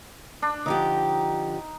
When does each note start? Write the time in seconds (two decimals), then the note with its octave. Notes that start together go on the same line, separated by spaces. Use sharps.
0.42 D4
0.66 D3 F3 D#4 G4